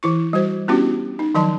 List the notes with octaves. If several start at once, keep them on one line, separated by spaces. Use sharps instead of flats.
E3 E4 C#6
G3 F#4 C5
B3 C#4 D4 E4 F#4 G4
D#4
D#3 F3 F#3 D#5 A5 C6